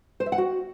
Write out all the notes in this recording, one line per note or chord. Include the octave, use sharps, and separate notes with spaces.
C5
E5
F#5
F#4